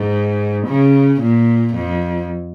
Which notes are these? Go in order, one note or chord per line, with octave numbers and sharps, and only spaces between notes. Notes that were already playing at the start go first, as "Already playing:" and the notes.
Already playing: G#2
C#3
A#2
F2